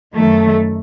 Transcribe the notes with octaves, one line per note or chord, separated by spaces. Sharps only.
F#2 D#3 A3